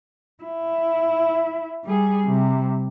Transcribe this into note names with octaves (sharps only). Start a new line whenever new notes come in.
E4
G3 G#4
C3 G3